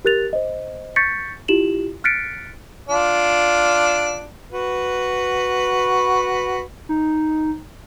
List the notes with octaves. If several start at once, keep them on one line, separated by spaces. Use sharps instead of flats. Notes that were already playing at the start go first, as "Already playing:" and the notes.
G4 A#4 F#6 A6 F7
C5 D#5
C#6 G6 A6 B6 C#7
E4 F4 G4 E7 F#7
F6 F#6 A6 B6 C#7 D7
D4 F4
F#4 B4
D#4